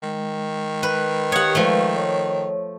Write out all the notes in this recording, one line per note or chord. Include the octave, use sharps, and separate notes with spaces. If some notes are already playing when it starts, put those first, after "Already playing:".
D#3 G#3
B4
G4 A#4 C#5 F#5 D#6
F3 G#3 A3 A#4 B4
C#5